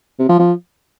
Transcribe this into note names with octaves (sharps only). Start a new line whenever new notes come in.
C3
F3
F3